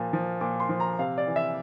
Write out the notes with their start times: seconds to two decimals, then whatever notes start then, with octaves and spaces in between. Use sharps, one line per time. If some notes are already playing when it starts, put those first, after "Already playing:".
Already playing: A#2 F3
0.13 F3
0.41 A#2 D6
0.60 C6
0.69 F3
0.80 A#5
0.99 C3 F5
1.18 D5
1.27 E3
1.36 E5